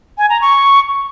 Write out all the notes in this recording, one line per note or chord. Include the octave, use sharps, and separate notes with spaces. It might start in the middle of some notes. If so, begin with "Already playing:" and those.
G#5
A#5
C#6